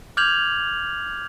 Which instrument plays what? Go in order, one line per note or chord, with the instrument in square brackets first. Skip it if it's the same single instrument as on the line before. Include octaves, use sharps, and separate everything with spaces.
[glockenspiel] D6 F6 G6 G#6 F7 F#7